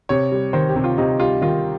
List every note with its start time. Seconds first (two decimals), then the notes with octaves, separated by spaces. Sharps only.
0.09 C3 C#5
0.32 G3
0.53 D#3 C5
0.69 G4
0.76 C3
0.84 F4
0.98 C3 D#4
1.20 G3 F4
1.42 D#3 F4